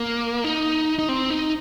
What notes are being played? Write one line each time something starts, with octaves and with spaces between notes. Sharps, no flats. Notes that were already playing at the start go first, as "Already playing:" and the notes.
Already playing: A#3
D#4
D#4
C4
D#4